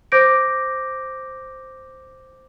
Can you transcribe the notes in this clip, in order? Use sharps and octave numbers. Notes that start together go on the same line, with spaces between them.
C5 D6 G6 A#6 D7